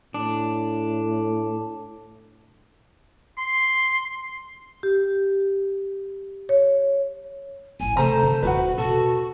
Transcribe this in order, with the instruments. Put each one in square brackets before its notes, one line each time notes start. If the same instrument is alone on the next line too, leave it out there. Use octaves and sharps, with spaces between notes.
[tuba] A2 [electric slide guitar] D4
[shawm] C6
[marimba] G4
C#5
[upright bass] A1 B3 [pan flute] G#5
[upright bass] C3 [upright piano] A3 A#5 [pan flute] C5
[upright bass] D3
[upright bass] D#1 F4 [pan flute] F#4 [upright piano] B4 F#5
[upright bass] B2 [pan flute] F#4 [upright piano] A4